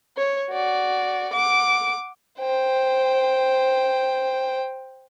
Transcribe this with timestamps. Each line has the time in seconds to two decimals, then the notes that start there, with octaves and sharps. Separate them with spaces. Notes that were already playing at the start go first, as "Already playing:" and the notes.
0.17 C#5
0.51 F#4 D5
1.33 F#5 D6
2.39 C5 G5